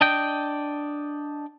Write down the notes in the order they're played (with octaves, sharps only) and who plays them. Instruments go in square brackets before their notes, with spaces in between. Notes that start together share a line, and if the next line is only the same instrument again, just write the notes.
[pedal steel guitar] D4 D#5 G5